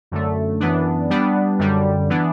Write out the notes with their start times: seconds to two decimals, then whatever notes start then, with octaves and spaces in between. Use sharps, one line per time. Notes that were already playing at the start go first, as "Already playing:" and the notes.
0.11 F#2 D3 A3
0.60 F#2 E3 B3 D4
1.10 G3 B3 D4
1.59 F#2 D3 G3
2.10 E3 B3 D4